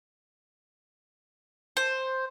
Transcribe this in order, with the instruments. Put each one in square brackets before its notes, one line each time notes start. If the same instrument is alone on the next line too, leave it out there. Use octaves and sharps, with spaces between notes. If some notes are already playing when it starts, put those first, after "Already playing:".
[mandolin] C5